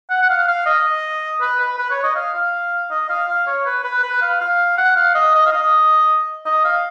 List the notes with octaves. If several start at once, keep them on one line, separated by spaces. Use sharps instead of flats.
F#5
F#5
F5
F5
D#5
B4
B4
B4
C#5
D#5
F5
F5
D#5
F5
F5
C#5
B4
B4
B4
F5
F5
F#5
F5
D#5
D#5
F5
D#5
D#5
F5